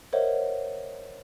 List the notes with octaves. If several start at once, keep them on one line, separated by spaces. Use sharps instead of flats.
A#4 C5 C#5 D#5 E5 F#5